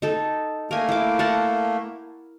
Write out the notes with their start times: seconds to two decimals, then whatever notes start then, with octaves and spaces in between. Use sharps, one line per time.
0.02 D#4 A4
0.71 A3 A#3 A#4 G#5
0.89 E4 D6
1.19 A#4 F#5 A5